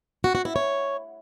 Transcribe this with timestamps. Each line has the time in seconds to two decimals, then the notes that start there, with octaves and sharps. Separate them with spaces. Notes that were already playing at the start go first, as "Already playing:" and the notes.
0.24 F#4
0.35 F#4
0.45 E4
0.56 C#5